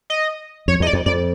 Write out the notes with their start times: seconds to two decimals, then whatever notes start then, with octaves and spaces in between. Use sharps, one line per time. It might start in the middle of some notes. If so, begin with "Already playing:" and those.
0.10 D#5
0.68 F2 C#5
0.80 E2 D#5
0.87 D5
0.93 F2
1.06 F2 D5